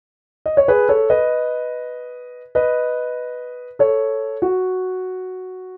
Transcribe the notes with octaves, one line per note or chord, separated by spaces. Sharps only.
D#5
C#5
G#4 B4
A4 C#5
B4 D#5
B4 D#5
A4 C#5
F#4